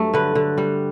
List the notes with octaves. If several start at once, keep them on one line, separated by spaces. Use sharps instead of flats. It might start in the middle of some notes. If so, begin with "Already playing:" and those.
Already playing: G2 F#3 A3
D3 B4
D3
G3